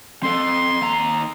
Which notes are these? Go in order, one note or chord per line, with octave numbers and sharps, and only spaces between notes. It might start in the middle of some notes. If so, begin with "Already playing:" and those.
C4 A4 C6
D#2 A#5